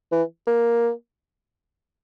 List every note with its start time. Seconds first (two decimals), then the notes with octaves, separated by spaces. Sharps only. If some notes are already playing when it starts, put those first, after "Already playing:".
0.12 E3
0.48 A#3